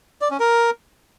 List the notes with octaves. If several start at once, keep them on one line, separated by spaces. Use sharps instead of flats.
D5
C#4
A#4